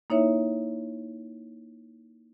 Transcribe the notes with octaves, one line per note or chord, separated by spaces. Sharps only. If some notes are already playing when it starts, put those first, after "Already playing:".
A#3 D#4 E4 C#5 E5